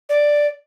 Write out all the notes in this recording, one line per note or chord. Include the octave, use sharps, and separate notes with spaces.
D5